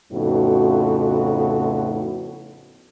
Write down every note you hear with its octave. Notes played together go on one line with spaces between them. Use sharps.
F2 A2 C#3 B3 D#4 F#4